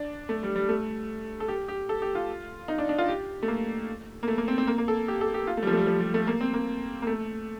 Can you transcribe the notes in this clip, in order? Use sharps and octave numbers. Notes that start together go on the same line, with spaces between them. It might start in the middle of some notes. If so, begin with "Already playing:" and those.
Already playing: D4
A3
G3
G3
A3
A4
G4
G4
A4
G4
F4
D#4
D4
D4
F4
G4
A3
A#3
A#3
A3
A#3
C4
C4
A#3
A#3
A4
G4
A4
G4
F4
A3
G3
F3
A3
G3
F3
G3
A3
A#3
C4
A#3
A#3
A3